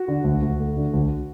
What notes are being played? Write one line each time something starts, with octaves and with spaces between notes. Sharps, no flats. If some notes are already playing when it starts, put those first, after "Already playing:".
Already playing: F#4
D3
D2
D2
A3
D3
D2